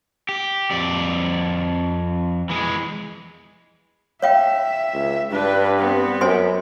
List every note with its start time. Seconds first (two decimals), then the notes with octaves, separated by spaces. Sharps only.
0.29 G4
0.70 F2 D5
2.50 E3 G#3
4.22 C#5 E5 F5 G5
4.94 C#2
5.31 G2 D4 B4
5.78 B3 C4
6.21 F#2 C5 G#5 C6